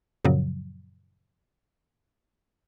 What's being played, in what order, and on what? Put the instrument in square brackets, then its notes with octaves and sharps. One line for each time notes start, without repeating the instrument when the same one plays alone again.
[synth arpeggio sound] F#2 A#2 C#3 F3 F#3